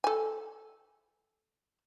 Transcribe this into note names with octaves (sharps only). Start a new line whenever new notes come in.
A4 G#5